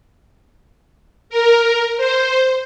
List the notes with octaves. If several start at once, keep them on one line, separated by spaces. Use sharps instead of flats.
A#4
C5